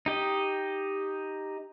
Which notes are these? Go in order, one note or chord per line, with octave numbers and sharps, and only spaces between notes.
D#4 G4 D#5